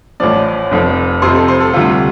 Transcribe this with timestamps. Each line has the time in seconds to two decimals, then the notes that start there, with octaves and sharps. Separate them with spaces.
0.20 A1 A2 F3 D5
0.71 F1 F2 F3
1.22 F2 C3 F3 C5
1.35 A4
1.48 C5
1.61 A4
1.74 D2 C3 G3 F4